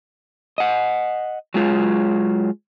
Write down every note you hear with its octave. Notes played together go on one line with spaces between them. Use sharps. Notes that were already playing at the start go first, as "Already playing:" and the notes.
D#5 F#5
F#3 G#3 F4